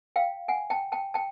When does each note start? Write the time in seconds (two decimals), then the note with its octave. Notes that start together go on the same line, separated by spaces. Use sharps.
0.16 F5 G5
0.48 F#5 G#5
0.70 G5 A5
0.92 G5 A5
1.14 G5 A5